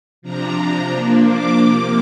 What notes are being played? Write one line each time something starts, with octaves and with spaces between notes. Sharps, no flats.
C3 F3 D4 A#5
F3 A#3 D4
D6
C3 F3 A#3